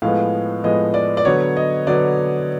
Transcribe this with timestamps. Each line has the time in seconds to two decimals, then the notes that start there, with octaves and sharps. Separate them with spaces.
0.02 A2 F3 G#3 B3 F5
0.64 A2 F3 G#3 B3 D#5
0.94 D5
1.17 D5
1.25 D3 F#3 B3 C#5
1.57 D#5
1.87 D3 F#3 B3 D5